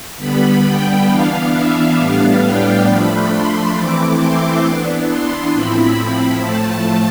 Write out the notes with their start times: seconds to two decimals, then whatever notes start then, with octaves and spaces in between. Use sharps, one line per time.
0.17 D3 G3 B3 B5
0.62 G5
1.06 E3 B3 D4 F5
1.51 E5
1.95 A2 G3 B3 D4 F5
2.41 G5
2.84 F3 A3 D4 B5
3.29 C6
3.74 E3 A3 C4 E4 D6
4.19 C6
4.63 E3 B3 D4
5.07 C6
5.52 A2 F3 C4 E4 B5
6.41 A2 F3 A3 A5